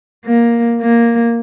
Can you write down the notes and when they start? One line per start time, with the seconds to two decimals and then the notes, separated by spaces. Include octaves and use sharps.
0.25 A#3
0.81 A#3